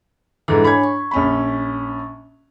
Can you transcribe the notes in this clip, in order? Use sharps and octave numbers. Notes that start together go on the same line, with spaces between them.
G#2 E3 D4 A4
D4 C#5 G#5 B5 G#6
C#6
A#1 C#4 B5